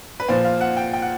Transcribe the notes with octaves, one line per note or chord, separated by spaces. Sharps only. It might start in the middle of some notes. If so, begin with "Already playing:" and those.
B4
A#2 F3 C5
F5
F#5
G5
G5
F#5